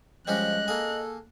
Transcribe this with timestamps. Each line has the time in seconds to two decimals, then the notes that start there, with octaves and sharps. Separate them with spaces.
0.27 F3 G3 G#3 C#4 D#5 F#6
0.68 A#3 G#4 A4